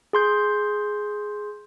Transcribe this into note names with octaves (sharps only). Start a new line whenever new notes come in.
G#4 C6 G6